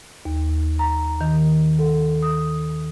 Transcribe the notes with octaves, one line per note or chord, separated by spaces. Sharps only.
D#2
A#5
D#3
A4
D#6